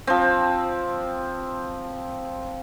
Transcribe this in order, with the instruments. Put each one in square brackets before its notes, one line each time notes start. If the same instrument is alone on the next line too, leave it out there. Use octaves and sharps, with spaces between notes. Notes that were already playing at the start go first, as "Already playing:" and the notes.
[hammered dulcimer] F3 C4